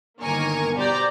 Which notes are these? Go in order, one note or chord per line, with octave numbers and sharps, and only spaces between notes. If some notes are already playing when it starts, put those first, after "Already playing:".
G1 D#3 A#3 A#4 G#5 C#6
B2 G4 C5 D5 A#5 G6